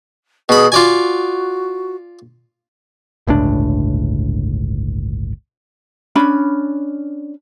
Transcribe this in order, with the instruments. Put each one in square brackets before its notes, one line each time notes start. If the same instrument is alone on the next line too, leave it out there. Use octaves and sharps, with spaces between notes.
[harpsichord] B2 B5 [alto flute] G#4
[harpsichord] F4 D5 G#5 [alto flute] F#4
[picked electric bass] G1 C#2 A2 D4
[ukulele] C#4 D4 B5